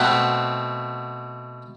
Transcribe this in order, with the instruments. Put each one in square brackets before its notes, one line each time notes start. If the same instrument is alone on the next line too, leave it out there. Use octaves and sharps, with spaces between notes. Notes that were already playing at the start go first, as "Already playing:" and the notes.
Already playing: [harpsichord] B2 A3 C4 F#5